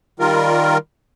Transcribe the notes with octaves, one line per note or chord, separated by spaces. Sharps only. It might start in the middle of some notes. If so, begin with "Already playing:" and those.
D#3 G3 F4 A#4